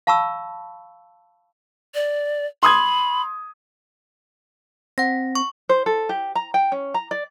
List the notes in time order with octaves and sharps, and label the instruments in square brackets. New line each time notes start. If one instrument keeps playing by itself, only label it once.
[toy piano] F5 A5 B5 C#6 E6
[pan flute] D5
[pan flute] B5 [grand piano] C6 D#6 G#6
[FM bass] C4 [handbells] F#5 A#6
[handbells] C#6
[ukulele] C5
A4
G4
A#5
G5
C#4
A#5
D5